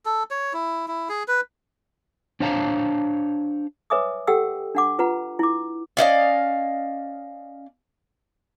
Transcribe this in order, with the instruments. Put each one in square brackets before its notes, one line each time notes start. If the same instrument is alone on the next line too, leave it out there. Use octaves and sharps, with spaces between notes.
[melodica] A4
C#5
E4
E4
G#4
B4
[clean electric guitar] D4 C5 C#5 F5 A5 A#5
[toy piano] B4 C#5 E5 G#5 D6 D#6
G4 A4 F#5 G5 E6
D4 F#5 D6
F4 B4 F#5 A#5
E4 D6
[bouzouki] C#4 D5 D#5 F5